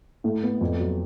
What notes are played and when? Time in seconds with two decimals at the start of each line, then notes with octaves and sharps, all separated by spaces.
0.24 A2
0.43 B3
0.61 F2
0.80 F#3